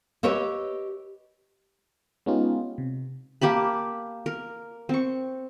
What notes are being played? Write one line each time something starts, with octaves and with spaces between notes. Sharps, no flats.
G4 B4 C#5 D#5 E5
G#3 B3 C#4 D#4 F4 G4
C3
A#3 G4 A5 B5
A#4
C4 C#6